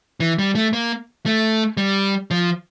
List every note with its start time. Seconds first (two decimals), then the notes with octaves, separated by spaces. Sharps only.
0.20 E3
0.39 G3
0.55 A3
0.73 A#3
1.26 A3
1.77 G3
2.31 F3